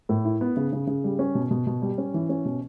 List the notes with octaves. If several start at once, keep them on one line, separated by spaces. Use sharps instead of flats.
A2
E4
B3
C#3
C#3
C#3
G3
C#4
B2
B2
B2
G3
C#4
E3
C#4
B2